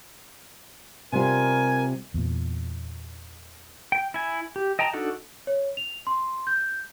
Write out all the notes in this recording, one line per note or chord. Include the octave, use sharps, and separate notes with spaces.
C3 G3 F4 A#4 G#5
E2 A#2
G5
E4 G#5
G4
D#5 G5 A5 A#5
D4 D#4 F#4 A4 F#5
C#5
F7
C6
G6